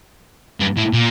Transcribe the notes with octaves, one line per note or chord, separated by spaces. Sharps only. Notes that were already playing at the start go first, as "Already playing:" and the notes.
G2
A2
A#2